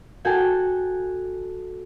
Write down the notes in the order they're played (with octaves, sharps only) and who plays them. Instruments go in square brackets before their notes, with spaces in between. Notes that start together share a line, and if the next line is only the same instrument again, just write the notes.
[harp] F#4 A4 G5 G#5